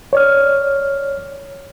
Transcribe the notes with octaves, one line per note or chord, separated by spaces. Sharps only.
C#5 D5 F6